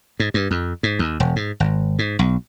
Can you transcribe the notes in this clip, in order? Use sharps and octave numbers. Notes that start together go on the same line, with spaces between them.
G#2
G2
F2
G#2
D#2
E1
G#2
G#1
G#2
B1